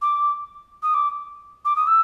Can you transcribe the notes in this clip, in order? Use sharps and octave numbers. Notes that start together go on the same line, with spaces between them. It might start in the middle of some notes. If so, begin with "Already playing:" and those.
D6
D#6
D6
D6
D#6
E6